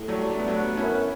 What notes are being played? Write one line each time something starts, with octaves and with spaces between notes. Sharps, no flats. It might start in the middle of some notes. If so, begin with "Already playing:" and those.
Already playing: A2
F#3 G3 A3
A3 D4
B3
F#3 A3
B3
F#2 C#4 E4